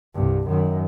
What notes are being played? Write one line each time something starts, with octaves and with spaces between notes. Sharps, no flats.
C2 G2
F#2 D#3